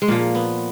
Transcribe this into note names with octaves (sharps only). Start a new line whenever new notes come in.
G#3
A#2 F3 A#3
B3